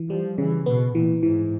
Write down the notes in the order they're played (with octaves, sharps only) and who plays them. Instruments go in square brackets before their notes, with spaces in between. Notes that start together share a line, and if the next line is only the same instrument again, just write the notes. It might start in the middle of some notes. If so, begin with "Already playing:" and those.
Already playing: [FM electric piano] E3
[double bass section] F3 [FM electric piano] G3
[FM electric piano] C#3 [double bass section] E3
[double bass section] B2 [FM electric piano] B3
[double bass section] A#2 [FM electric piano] E3
[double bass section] G#2 [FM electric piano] E3